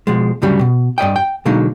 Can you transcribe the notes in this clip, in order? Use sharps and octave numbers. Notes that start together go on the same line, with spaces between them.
B2 F3 G#3
D2 G2 C#3 F#3 G3 G4
B2
G2 D5 D#5 G5
G5
B2 D3 F#3 G#3 A#3 D#4